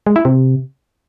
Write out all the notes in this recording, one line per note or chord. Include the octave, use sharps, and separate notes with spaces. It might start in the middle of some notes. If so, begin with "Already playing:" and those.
G#3
E4
C3